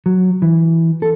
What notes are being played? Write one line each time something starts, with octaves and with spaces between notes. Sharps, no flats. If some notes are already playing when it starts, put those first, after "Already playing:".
F#3
E3
A4